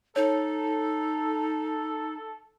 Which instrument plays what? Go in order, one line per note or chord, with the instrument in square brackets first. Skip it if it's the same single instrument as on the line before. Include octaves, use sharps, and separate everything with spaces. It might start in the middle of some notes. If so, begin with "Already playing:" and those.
[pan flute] D#4 [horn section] A4 [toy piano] C#5